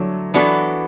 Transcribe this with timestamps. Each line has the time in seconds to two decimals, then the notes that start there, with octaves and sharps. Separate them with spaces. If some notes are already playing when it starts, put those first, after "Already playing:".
Already playing: D3 F#3 A3 E4
0.34 E3 B3 D4 F#4 A4